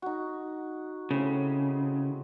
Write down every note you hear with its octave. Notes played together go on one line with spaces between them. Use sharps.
D#4 F#4
A2 C#3 C4